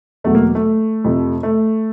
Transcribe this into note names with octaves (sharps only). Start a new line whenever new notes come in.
E2 B2 F#3 A3
A#3
A3
F2 C3 F3
A3